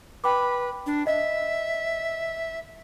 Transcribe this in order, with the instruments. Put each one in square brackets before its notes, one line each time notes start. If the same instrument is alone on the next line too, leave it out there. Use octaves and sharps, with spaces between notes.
[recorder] B4 [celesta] G5 B5 D6
[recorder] D4
[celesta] D#5 [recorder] E5